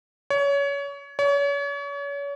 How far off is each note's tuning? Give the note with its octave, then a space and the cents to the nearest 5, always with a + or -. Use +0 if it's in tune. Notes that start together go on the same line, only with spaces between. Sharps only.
C#5 +25
C#5 +35